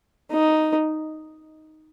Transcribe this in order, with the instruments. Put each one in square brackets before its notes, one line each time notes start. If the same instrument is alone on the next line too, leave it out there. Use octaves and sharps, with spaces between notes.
[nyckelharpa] D#4